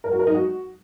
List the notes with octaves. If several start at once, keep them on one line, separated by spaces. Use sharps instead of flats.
A#4
F#4
A#4
D#4
F#4